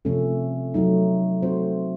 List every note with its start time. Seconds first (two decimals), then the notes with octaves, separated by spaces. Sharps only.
0.05 C3 F3 A3 C#4 A4
0.74 F#3 A3 D#4
1.42 A3 C4 F#4 C5